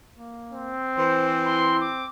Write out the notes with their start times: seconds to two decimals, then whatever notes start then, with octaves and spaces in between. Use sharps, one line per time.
0.16 A#3
0.52 C4
0.98 E3 C5
1.45 E4 C6
1.80 D6